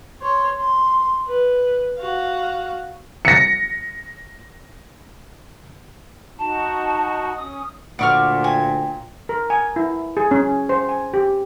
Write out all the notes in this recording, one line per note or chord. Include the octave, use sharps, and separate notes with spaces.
C#5 C6
C6
B4
F#4 F5
A#6 C#7
D#4 F#4 A5
C#4 D#6
D2 A#2 D5 F#5 C#6 F6
G5 G#5
A#4
G#5
E4
G#4
C#4
C5
G#5
G4